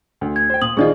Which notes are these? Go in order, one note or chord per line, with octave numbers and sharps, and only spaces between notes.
D2
G#6
C5 G5
A#2 D#6 F#7
A#1 D#3 F4 G#4 D5 D#5